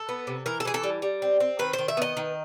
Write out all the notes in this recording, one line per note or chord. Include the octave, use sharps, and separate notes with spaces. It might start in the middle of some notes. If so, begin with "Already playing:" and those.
Already playing: A4
B3
C3
E3 A#4
A4
E3 G#4
A4
G3
G3
C4
C4
D#3 B4
D#3 C5
E5
B3 D#5
D#3